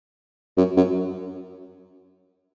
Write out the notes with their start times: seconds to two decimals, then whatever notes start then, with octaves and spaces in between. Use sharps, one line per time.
0.57 F#2
0.77 F#2